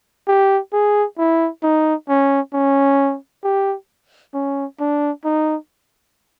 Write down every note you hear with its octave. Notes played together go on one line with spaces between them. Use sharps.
G4
G#4
E4
D#4
C#4
C#4
G4
C#4
D4
D#4